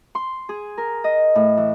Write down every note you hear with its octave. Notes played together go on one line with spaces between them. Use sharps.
C6
G#4
A#4
D#5
A2
E3